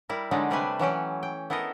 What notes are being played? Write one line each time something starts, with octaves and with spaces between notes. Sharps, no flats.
G3 E4 A#4
D3 F#3 G#3 D4 D#4
C3 G3 A3 D4 B4 G#5
E3 F#3 C#4 G5
G5
B3 E4 A4 A#4 D#5